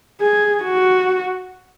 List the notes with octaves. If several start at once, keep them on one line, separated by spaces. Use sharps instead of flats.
G#4
F#4